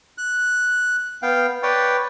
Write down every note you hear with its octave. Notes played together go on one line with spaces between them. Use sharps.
F#6
B3 F5 G5
B4 C#5 D5 G5